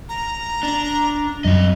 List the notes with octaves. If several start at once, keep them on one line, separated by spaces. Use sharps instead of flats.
A#5
D4
F#2 F#3 C4 D#5